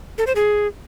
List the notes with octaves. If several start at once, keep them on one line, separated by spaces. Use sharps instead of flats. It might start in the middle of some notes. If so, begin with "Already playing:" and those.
A4
C5
G#4